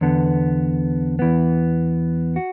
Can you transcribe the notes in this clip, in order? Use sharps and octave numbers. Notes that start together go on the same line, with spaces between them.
E2 D3 B3
E2 E3 B3
F#4